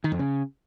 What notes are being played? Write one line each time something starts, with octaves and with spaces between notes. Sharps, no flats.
D#3
F2
C#3